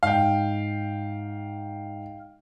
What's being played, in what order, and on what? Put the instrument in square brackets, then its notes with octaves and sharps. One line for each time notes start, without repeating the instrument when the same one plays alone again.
[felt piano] G#2 [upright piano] F5 G5